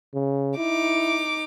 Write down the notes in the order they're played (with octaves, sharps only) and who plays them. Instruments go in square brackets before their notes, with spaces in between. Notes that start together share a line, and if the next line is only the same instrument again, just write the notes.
[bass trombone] C#3
[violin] D#4 D6 [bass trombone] E4